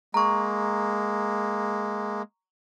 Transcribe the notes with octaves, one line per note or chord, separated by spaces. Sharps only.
G#3 A#3 A#5 C#6